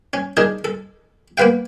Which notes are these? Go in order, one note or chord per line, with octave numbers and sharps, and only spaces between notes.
C#4
D4 D#4 G#4 A#4
A4
A#3 B3 B4 F5 G5